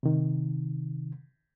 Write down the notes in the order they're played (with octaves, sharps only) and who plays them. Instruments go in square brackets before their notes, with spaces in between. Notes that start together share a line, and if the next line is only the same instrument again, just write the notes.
[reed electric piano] C3 D#3